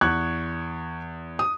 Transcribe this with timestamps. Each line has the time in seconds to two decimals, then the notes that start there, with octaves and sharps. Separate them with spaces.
0.01 E2 C#6 F#6 G#6
1.39 D#6